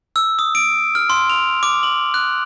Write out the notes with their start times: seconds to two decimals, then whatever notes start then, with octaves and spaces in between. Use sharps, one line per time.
0.16 E6
0.39 D#6
0.55 D7
0.95 F6
1.10 C6
1.30 F7
1.63 D6
1.83 F#7
2.14 F#6